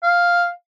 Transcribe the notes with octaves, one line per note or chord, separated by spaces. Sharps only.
F5